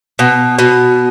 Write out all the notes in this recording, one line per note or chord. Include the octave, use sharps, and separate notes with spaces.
B2
B2